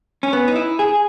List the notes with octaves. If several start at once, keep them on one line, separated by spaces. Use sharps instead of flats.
C#4
B3
D#4
E4
G#4